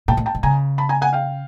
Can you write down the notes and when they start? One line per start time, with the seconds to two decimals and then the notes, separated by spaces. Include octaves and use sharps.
0.08 A#2 G5 A5
0.17 A2
0.26 G5 A5
0.35 G#2
0.43 C#3 G#5 A#5
0.78 A5 B5
0.89 G#5 A#5
1.01 F#5 G#5
1.13 F5 G5